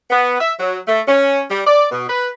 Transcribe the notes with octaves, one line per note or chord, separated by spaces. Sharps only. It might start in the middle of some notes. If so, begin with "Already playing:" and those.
B3
E5
F#3
A3
C#4
G3
D5
B2
B4